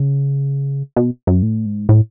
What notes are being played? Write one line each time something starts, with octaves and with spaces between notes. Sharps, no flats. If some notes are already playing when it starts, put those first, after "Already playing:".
Already playing: C#3
B2
F#2
A2
G#2
A2